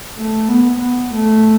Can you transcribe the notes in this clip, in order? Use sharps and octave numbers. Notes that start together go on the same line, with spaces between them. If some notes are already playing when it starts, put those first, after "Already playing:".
A3
B3
B3
A3